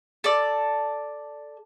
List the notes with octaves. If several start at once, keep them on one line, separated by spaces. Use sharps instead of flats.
A4 D5